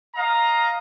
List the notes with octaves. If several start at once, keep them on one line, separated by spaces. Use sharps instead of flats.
D#5 F5 A#5